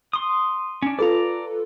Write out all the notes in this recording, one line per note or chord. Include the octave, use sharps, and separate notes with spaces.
C6 D#6
C#4 D4
F4 A4 B4 D5 A#5